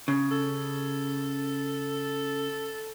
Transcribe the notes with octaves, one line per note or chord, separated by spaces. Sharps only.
C#3
A4